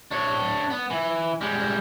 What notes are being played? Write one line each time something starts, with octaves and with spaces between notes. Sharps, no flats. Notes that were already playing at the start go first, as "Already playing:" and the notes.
D4 C#5
B3
E3
G3 G#3